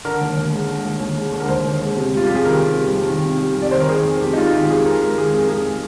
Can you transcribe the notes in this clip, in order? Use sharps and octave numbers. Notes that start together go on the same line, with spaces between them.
D3 A#4
D#2
D#2
G#3
D3
D#2
D#2
G#3
D3
A#4
D#2 C5
D#2
G#3
C3
G3 F4
F2 G4
G#4
D#3 A#4
C3
G3
F2
D#3
C3
G3
F2 D5
D#3 C5
A#4
D#3 G#4
F2
F2 G4
D#4
G#3 F4
D#3 G4
F2 G#4
F2 A#4
G#3 A#4
D#3 G#4
F2 G#4
A#4
F2 G#4
G#3